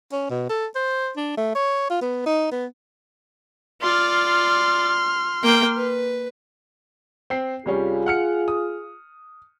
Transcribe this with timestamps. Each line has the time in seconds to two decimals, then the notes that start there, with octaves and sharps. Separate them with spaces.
0.12 C#4
0.30 B2
0.49 A4
0.75 C5
1.16 D4
1.37 A3
1.55 C#5
1.90 F4
2.02 B3
2.26 D#4
2.52 B3
3.82 F4 D5 C6 F6
5.43 A#3 G5
5.76 B4
7.30 C4 G5 C7
7.66 C2 G3 C#4 F4 G#4
8.06 F#5 F6 C#7
8.48 D#6